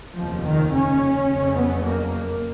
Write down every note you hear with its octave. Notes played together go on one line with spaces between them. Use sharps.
F1 D#2 C#3 F3
D#3
C#4
F#1 F2 C#3
B3
A#3